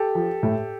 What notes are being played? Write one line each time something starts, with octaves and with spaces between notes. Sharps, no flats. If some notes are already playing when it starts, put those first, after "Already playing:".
Already playing: G4 A4
F3
A2